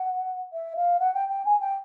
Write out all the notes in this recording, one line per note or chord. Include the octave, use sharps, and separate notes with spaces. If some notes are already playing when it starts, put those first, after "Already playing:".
Already playing: F#5
E5
F5
F#5
G5
G5
G#5
G5